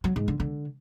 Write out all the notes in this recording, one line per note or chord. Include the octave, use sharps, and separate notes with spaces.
F#3
G#2
D3
D3